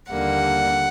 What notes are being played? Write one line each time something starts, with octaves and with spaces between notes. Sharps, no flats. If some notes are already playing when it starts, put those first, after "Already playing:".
D#2 D3 G3 A#3 F#5